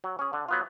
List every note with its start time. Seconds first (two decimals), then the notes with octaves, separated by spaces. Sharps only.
0.04 F#3
0.19 C#4 G#4
0.33 D3
0.49 F#3 B3 F4